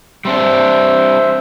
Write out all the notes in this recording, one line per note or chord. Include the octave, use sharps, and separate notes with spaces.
G3 C4 D4 C5 E5